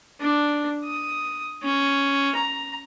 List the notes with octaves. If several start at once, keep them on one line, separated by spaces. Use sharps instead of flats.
D4
D#6
C#4
A#5